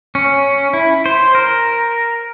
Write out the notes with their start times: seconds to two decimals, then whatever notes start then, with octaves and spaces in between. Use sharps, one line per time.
0.15 C#4
0.73 E4
1.06 C5
1.35 A#4